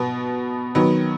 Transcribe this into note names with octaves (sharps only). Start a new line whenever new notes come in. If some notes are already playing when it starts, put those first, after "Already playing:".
Already playing: B2 B3
D#3 F#3 B3